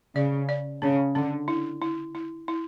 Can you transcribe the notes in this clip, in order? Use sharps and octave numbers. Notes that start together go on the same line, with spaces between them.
C#3 D5
D5
C#3 C#4
D3 C#4
E4
E4
E4
E4